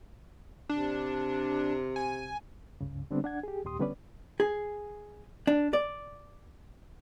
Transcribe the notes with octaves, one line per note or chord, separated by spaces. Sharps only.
C3 D4
G#5
C#2 G2 C#3
D3 G3 B3 C4 D4
D4 F#5 G#6
G4 G#4
D#2 A#2 G4 C6 D#6
D3 G3 B3 C#4 B4 D5
G#4
D4
D5